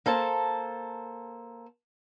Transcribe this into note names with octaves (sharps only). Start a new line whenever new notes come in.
A#3 A4 C5 A5